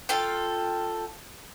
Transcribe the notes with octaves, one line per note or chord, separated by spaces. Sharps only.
F4 A4 F5 G5